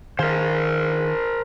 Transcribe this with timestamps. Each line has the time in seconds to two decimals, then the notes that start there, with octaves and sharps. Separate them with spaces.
0.19 D#3 G#4 A#4 C5 F5